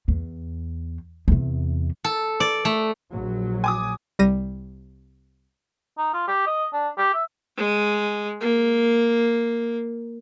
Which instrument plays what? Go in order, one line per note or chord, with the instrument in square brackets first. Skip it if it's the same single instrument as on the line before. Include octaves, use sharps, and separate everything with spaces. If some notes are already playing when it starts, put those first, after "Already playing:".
[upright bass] E2
E2 C3
[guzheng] A4
D5
A3
[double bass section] A#1 F#3
[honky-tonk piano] G#5 D6 D#6
[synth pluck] C2 G3 A#6 D#7
[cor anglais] D#4
F4
G4
D#5
D4
G4
E5
[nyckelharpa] G#3
A#3